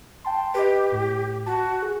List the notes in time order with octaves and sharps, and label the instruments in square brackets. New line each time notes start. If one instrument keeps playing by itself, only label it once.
[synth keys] G5 A5 C6
[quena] G4 [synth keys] B4 D#5
[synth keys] A2
[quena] F#4 [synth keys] A5
[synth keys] G#4